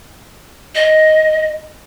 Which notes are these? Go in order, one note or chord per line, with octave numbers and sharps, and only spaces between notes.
D#5